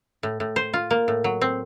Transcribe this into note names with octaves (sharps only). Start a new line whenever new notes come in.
A2
A2
C5
F4
A#3
A2
F#3
C4